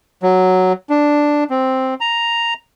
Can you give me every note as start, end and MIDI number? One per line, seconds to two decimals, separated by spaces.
0.23 0.73 54
0.90 1.44 62
1.50 1.94 60
2.01 2.54 82